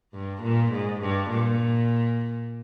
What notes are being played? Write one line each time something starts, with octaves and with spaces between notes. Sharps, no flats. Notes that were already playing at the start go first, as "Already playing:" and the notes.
G2
A#2
G#2
G2
A#2